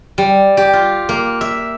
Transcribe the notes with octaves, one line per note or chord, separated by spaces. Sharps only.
G3
G4
F4
A#3
E5